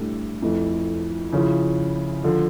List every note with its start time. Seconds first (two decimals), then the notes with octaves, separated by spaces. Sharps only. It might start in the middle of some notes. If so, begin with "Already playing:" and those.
Already playing: A2 G3 D4 A4
0.42 F2 E3 A3
1.32 C#3 F3 C#4 E4
2.24 D3 F3